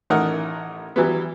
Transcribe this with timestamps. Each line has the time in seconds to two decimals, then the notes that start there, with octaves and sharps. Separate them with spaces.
0.10 A1 A3 D#4 A#4 F#5
0.96 E3 F#3 G3 B3